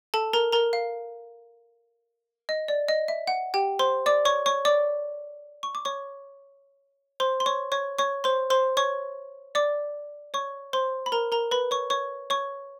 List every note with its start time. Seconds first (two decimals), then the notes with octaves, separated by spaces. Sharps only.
0.14 A4 A5
0.33 A#4 A#5
0.52 A#4 A#5
0.73 F5
2.49 D#5
2.68 D5
2.89 D#5
3.08 E5
3.27 F#5
3.54 G4 G5
3.79 C5 C6
4.06 D5 D6
4.25 C#5 C#6
4.46 C#5 C#6
4.65 D5 D6
5.63 C#6
5.75 D6
5.85 C#5 C#6
7.20 C5 C6
7.40 C6
7.46 C#5 C#6
7.72 C#5 C#6
7.98 C#5 C#6
8.24 C5 C6
8.50 C5 C6
8.77 C#5 C#6
9.55 D5 D6
10.34 C#5 C#6
10.73 C5 C6
11.06 B5
11.12 A#4 A#5
11.32 A#4 A#5
11.51 B4 B5
11.71 C#5 C#6
11.90 C#5 C#6
12.30 C#5 C#6